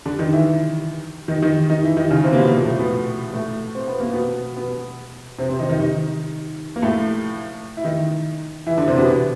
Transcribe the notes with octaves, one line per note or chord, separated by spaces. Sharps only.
D3 D4
D#3 D#4
E3 E4
D#3 D#4
D#3 D#4
D#3 D#4
E3 E4
D#3 D#4
C#3 C#4
C3 C4
A#3
B2 B3
A#2 A#3
A2 A3
B2 B3
A2 A3
C4
B3
A#3
B2 B3
B2 B3
C3 C4
C3 C4
D#3 D#4
D#3 D#4
D#3 D#4
A#3
A2 A3
E4
D#3 D#4
E3 E4
D3 D4
C3 C4
B2 B3
B2 B3